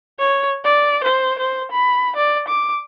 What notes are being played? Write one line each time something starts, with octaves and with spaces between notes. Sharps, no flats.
C#5
D5
C5
C5
B5
D5
D6